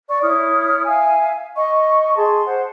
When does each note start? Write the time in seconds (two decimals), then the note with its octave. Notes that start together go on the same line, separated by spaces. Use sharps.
0.08 D5 C#6
0.22 E4 C#5 D#6 F6
0.86 E5 F5 G#5
1.56 D#5 C#6
2.16 G#4 A5 C6
2.46 C5 F#5